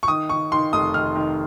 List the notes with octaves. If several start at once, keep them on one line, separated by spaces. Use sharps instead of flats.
C#6
D#3 D#6
D#3 C#6
D#3 C6
F1 D#6
D#3 F6
D#3